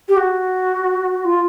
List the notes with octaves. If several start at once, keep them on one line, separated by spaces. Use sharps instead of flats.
G4
F#4
F4